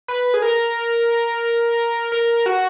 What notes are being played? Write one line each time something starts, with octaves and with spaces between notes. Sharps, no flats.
B4
G#4
A#4
A#4
F#4